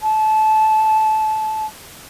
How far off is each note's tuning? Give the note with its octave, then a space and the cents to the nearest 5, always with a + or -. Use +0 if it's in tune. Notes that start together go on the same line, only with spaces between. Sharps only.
A5 -20